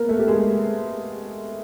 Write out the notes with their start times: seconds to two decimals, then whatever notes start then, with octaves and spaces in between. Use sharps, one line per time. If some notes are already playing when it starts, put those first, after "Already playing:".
Already playing: A#3 B3 A#4 B4
0.09 A3 A4
0.19 G4
0.28 G#3 G#4